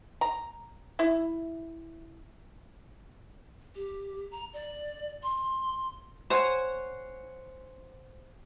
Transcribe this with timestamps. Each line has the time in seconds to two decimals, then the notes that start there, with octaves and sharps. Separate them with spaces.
0.21 A#5
0.99 E4
3.75 G4
4.31 A#5
4.53 D5
5.23 C6
6.30 C5 C#5 F#5 G#5